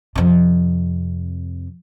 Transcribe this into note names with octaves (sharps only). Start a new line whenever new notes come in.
F2 C3